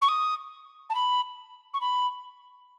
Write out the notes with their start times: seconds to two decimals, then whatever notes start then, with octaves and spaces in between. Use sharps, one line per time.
0.01 C#6
0.08 D#6
0.89 A5
0.94 B5
1.73 C#6
1.80 B5